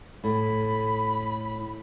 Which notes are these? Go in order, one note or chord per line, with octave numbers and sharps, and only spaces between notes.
A2 B5